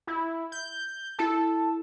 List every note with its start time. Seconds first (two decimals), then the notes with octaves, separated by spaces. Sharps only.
0.07 E4
0.52 G6
1.19 E4 A4 A5